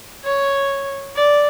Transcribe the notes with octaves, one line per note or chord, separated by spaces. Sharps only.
C#5
D5